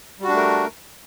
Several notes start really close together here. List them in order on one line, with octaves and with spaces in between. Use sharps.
G3 F#4 D4 A3 A#4